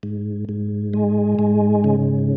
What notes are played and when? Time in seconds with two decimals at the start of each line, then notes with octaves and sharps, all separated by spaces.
0.03 G#2
0.49 G#2
0.93 G#3
1.39 G#2
1.84 C#3